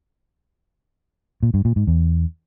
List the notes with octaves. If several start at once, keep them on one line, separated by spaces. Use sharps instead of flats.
A#2
G2
A#2
G#2
E2